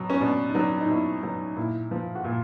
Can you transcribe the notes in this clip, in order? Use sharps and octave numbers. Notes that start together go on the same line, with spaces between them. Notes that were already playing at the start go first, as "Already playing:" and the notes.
Already playing: B2 F#3
C#4
B2 D4
D#4
F#3 D4
D4
D#4
B2 E4
F#3
A#2 E4
F3
F#4
A#2 F4